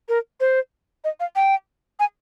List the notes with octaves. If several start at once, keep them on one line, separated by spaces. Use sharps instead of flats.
A#4
C5
D#5
F5
G5
G#5